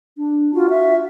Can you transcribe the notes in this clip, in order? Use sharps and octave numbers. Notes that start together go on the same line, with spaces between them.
D4
F4 F#4
E5